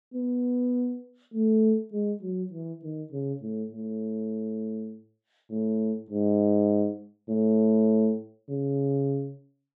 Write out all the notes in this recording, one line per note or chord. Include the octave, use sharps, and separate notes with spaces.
B3
A3
G#3
F#3
E3
D#3
C#3
A2
A2
A2
G#2
A2
C#3